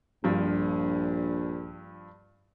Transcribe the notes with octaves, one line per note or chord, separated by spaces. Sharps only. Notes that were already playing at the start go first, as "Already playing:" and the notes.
A#1 G2 F3